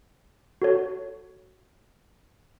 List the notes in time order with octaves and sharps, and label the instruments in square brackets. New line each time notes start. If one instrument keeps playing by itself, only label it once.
[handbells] F#4 A4 C#5